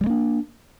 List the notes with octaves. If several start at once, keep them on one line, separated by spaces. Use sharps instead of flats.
G3 G#3 A#3 D4